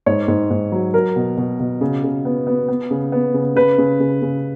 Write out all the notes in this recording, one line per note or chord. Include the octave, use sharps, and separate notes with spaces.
G#2 C#5
G#2
G#2
F#3
F#3 A#4
B2
B2
B2
C#3
C#3
B3
B3
B3
C#3
B3
C#3
C#3 B4
C#3
C#3
C#3